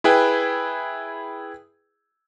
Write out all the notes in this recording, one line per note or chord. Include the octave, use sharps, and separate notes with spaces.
E4 G#4 B4 G5